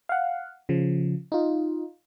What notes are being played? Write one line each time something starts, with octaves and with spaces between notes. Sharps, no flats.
F5 F#5
C#3 F3
D#4 F4